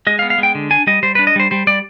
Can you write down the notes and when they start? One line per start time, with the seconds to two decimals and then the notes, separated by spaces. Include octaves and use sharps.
0.07 G#3 D#5
0.19 F5
0.22 B3
0.30 F5
0.38 G#3
0.43 G5
0.55 D3
0.70 D4 G#5
0.87 G3 D#5
1.03 G3 C5
1.15 B4
1.19 D4
1.27 D#5
1.36 G3 C5
1.51 G3 C5
1.67 G3 D5